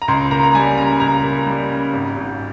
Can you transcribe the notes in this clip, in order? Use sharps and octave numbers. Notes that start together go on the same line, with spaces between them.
A#5
C#2 C6
A#3 A#5
A#5
G3 G#5
C#3 A#5
C#2 A#5
A#3
G3
C#3
G#1
G#1